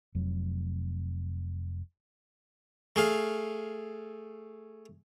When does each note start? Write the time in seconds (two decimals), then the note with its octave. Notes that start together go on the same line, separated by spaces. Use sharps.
0.15 F1 F2 F#3
2.96 A3 G#4 F5